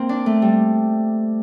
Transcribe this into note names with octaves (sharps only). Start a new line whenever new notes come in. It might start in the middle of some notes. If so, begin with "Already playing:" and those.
Already playing: A#3 C4
D4
A3
G3